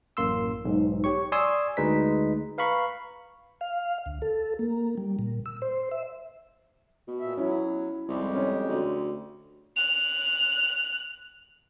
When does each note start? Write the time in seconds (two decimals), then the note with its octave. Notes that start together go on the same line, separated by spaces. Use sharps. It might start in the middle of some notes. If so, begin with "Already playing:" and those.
0.17 A1 F#2 A#3 C6 E6
0.65 B1 G#2
1.04 G4 C#5 C#6
1.32 D5 G#5 C6 C#6 D#6 E6
1.77 D2 G#3 D#4 B4 B6
2.58 B4 F5 A#5 B5 C#6
3.61 F5
4.06 D2
4.22 A4
4.59 A#3
4.97 G3
5.19 A#2
5.46 E6
5.62 C5
5.91 E5
7.08 B2
7.20 A#2 E5
7.37 F#3 C#4 E4
8.08 C2 F2 G#3 G4
8.35 C#4
8.69 D2
9.76 F#6 F7